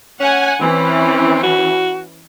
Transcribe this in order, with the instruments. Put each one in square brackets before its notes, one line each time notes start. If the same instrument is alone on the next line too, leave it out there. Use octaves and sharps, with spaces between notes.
[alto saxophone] C#4 [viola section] F#5 G#5
[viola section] E3 C#4 [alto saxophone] C4
[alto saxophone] F#4